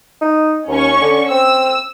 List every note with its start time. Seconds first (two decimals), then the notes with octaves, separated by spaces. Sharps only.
0.22 D#4
0.68 D#2 C#4 C#6
1.02 D3
1.30 C4 E6